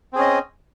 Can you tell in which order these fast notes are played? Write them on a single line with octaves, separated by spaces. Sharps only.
C4 G#4 C#4 D#5